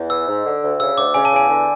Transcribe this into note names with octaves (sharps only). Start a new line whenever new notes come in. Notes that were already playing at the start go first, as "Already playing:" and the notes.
Already playing: E2
E3 E6
G#2
D3
D2
C#3 E6
D2 D6
C#3 G#5
A5
E2 G#5
D3